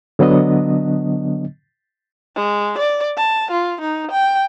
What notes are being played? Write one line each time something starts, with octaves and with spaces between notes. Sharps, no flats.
D3 F#3 B3 D4 D#5
G#3
D5
A5
F4
D#4
G5